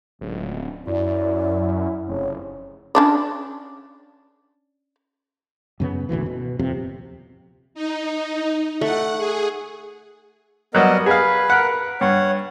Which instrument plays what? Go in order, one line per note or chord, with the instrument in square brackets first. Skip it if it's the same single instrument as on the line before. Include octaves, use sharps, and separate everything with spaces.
[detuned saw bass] D1 [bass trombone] C#2
[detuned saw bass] F#2 [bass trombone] E4 [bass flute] D5
[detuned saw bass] F1 [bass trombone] C#3 [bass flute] C#5
[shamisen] C#4 D4 D5
[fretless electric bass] F#2 C#3 B3
G#1 D2 B2 E3
B2
D#1 F2 C3
[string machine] D#4
[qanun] A3 [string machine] F#5
[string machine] G#4
[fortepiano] F#3 G3 [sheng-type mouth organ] B3 A#4 D#5
[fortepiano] G#4 F5 [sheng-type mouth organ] B4
[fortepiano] A#4 F#5
[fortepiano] G2 [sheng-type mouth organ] C#5 F#5